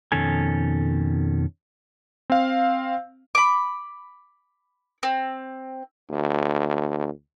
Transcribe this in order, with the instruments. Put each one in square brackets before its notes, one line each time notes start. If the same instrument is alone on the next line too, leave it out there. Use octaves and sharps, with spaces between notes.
[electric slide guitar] F2 B2 D#3 C#4 A4 G#5
[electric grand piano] C4 F5
[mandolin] B5 D6
C4
[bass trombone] D2